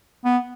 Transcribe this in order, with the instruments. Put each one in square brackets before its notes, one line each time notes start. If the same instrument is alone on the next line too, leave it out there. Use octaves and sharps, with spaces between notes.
[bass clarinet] B3